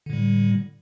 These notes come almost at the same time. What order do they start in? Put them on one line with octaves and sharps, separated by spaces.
D3 A2 G3